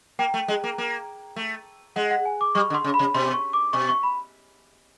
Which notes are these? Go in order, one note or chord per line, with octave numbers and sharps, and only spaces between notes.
A#3 G5
A3
G#3
A#3
A#3
A3
G#3 F#5
F#5
G#5
D6
G3 C#6
D3
C6
C#3
B5
C3
B2 C6
C#6
D6
B2 C#6
C#6
B5